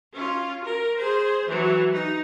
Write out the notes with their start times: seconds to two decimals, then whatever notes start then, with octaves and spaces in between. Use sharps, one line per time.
0.13 C#4 F4
0.64 A#4
0.98 G#4 C5
1.48 E3 F#3
1.93 D#4